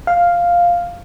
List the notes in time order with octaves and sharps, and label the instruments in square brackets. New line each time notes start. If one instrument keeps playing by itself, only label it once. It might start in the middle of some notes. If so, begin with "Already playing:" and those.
[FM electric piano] F5